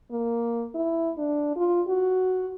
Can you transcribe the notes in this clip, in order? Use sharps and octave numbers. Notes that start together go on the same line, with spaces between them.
A#3
E4
D4
F4
F#4